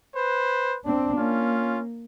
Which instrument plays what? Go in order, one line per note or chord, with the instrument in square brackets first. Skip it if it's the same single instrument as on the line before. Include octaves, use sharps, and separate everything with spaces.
[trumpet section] B4 C5
[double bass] C4 D4
[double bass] A#3 [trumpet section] C#4 F4